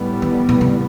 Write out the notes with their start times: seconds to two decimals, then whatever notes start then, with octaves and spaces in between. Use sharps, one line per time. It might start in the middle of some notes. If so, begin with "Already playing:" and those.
Already playing: A2 G3 B3
0.22 D#3
0.49 B2
0.61 C3